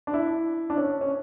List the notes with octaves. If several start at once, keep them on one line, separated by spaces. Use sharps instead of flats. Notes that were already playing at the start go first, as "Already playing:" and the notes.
D4
E4
D4
C#4
C#4